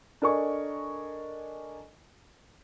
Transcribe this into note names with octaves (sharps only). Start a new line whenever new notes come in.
D4 A4 A#4 D#5 G#5 C#6